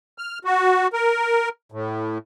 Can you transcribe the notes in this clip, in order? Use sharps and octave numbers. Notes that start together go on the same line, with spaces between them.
F6
F#4
A#4
A2